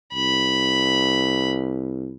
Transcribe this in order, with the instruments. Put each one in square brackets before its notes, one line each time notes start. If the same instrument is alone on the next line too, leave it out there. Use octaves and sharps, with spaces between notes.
[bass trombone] C2 [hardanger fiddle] B5